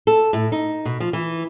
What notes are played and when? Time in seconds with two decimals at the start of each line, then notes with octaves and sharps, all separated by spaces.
0.07 A4
0.33 A2
0.52 D#4
0.85 B2
1.00 F3
1.13 E3